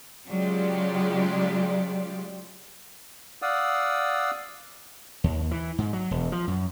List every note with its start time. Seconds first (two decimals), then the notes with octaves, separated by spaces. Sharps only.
0.29 C#3 F#3 G#3 F4 G4 D5
3.42 D5 F5 F#5 D#6 E6
5.24 D#2
5.51 E3
5.78 G#2
5.93 F#3
6.11 E1
6.32 F3
6.48 F#2